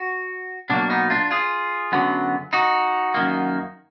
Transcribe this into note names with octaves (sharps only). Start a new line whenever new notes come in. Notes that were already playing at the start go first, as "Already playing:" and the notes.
Already playing: F#4
B2 F#3 A#3 D4
B3 D#4
D4 F4
F4 G#4
F#2 D3 F#3 B3
D#4 F#4
F#2 D#3 A#3